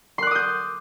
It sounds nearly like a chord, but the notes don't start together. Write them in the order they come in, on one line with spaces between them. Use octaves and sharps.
C6 F#6 D6 D#6 G6